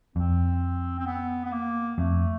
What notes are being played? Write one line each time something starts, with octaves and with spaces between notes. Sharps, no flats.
F2 C4
C4
B3
B3
A#3
F2 A3